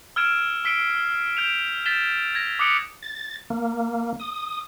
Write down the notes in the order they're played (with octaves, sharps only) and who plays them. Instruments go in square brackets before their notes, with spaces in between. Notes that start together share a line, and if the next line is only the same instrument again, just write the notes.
[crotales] E6 F6 G#6 D7 E7
E6 B6 C7 D7 G7
G6 D7 E7 F7
G6 A6 B6 E7 G7
G#6 A#6
D6 D#6 F#6 C#7 D7 G7
[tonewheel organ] A6
A#3
D#6